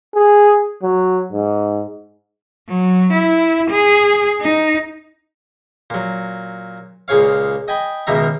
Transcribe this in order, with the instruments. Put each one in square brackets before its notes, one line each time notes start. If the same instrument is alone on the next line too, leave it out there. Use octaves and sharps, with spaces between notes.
[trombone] G#4
F#3
G#2
[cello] F#3
E4
G#4
D#4
[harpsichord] A#2 F#3
C#2 A#2 G#4 C#5 F5
D#5 G5 G#5 B5
C#2 B2 D#3 A#3 E5 A#5